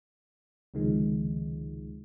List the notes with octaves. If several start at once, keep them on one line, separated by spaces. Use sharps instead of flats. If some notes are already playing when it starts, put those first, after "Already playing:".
C#2 C3 D#3 F3 G#3